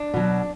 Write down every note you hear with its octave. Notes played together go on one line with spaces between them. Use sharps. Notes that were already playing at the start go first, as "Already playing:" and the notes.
Already playing: D4
B2 F#3